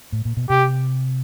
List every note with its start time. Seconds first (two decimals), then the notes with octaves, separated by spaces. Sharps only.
0.12 A2
0.25 A#2
0.37 B2
0.50 C3 G4